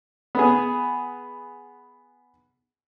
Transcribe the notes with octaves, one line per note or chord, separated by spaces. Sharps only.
B3 G#4